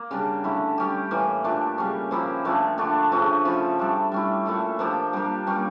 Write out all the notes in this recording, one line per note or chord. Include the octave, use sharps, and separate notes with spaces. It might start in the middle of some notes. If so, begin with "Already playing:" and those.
Already playing: A#3
C#3 G3 D4
D3 A3 E4 G4
G3 C#4 G4
A2 E3 A#3
A#2 A3 D4 G4
C#3 G3 A#3 C#4
F3 A#3 E4 G4
A#2 F3 A3 D4
D3 A3 D4 A4
C#3 F3 A3 D4
F3 C#4 E4
G3 D4 A4
G3 C#4 E4
A#2 A3 E4 A4
F3 A#3 D4 G4
G3 A#3 D4 G4
G3 A#3 C#4